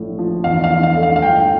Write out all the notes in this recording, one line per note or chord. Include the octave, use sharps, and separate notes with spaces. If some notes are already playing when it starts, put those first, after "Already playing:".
Already playing: A#1 A2
F3
E2 F5
F5
E3
F5
A3
F5
F5
G1 G5